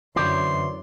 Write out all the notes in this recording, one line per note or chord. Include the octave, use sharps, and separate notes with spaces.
F#2 D3 E3 C5 D5 C6